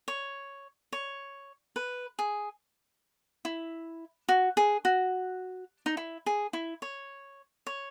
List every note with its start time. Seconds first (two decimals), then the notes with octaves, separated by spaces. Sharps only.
0.08 C#5
0.92 C#5
1.76 B4
2.19 G#4
3.45 E4
4.29 F#4
4.57 G#4
4.85 F#4
5.86 D#4
5.97 E4
6.26 G#4
6.53 E4
6.82 C#5
7.67 C#5